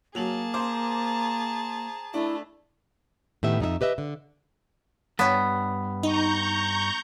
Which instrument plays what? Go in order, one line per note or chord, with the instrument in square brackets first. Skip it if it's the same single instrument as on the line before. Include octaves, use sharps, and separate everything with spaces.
[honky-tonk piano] F#3 F7 F#7 [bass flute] A#3 [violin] G#4 A5
[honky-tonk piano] C5 D6 [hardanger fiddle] A#5
[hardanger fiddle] A3 [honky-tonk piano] D4 [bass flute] E4
[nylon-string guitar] A2 D#3 B3 G4 E5
F2 D#4 G#4 E5
G4 B4 D#5 E5
D3
[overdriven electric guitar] G2 [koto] B3 [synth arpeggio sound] C#5 A5
[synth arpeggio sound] D#4 [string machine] A#5 C#6 G6